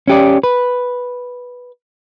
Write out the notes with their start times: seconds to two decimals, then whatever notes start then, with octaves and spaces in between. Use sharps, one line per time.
0.08 C#4 G4 D5
0.43 B4